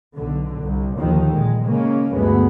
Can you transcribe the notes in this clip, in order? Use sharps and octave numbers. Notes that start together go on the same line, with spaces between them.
B1 D3
C2
D#2 D3 D#3 F3
A#1 G#3
C#3 G#3 A#3 C#4
D2 G2 G#3 B3